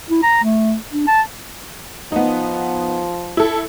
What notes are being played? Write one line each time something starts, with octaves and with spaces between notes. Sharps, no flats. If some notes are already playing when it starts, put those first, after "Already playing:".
E4
A#5
A3
D4
A5
F3 B3 D#4
E4 A4